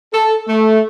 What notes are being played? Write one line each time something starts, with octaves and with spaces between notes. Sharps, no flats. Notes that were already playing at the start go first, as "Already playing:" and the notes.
A4
A3